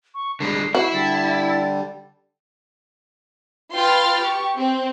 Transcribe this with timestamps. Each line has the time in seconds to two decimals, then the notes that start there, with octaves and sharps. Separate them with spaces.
0.14 C#6
0.40 D3 G3 G#3 C7
0.75 E4 F#4
0.94 D3 G3 A6
3.74 F4 B4 G5 C6 F6 A6
4.21 G4 C#6
4.57 C4